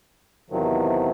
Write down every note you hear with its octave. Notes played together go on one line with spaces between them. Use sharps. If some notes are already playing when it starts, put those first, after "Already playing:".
E2 C3 D#3 F3 F#3